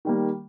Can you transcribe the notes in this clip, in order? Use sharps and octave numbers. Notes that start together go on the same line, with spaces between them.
D#3 G3 A#3